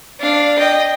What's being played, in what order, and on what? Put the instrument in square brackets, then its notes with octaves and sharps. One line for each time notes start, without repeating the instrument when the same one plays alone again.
[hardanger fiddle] D4 F5
D#5 G5